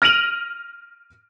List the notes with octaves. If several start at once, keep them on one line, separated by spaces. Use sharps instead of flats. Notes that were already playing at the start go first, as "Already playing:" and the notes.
F6 A#6 D7 D#7 F7 F#7